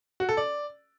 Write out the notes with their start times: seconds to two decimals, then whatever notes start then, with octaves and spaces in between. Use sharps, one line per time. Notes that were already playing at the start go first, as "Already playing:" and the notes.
0.20 F#4
0.29 A4
0.37 D5